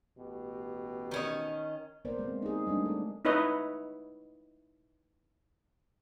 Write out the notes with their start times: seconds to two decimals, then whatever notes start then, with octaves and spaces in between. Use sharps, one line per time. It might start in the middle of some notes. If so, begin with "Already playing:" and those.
0.18 A1 B2 G4
1.11 D#3 C#4 D#5
2.05 A#3 B3 A#4 C5 D5
2.19 G#3 C4
2.42 D#4 G#4
2.67 G3 A3 D4
2.86 A4
3.25 D#4 E4 B4 C#5 D#5